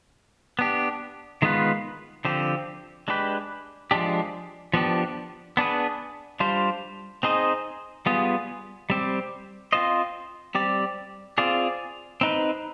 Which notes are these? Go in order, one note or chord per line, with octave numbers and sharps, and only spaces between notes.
B3 D4 G4
D#3 G#3 B3 F4 B4
D3 F3 C4 G4
G#3 D4 G4 B4
F3 G#3 D4 G4
F3 B3 D4 G4
B3 D4 G#4 B4
G3 D4 F4 C5
C4 D#4 G#4 C5 D#5
G3 B3 F4 G#4
G3 C4 G4
C4 F4 C5 D#5
G3 C4 G4 D5
C4 F4 G#4 D5
C4 D#4 B4